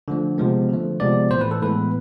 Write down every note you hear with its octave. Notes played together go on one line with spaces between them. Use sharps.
D3 F3 A3
C3 F3 G#3 B3
D3 F3 A3
C3 F3 G#3 B3 D5
A2 E3 A3 C5
B4
A4
A2 E3 G#3 B3 B4